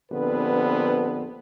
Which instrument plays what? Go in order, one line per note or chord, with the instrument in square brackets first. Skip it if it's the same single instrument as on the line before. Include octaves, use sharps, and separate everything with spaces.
[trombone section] A#1 D3 B3 C4 B4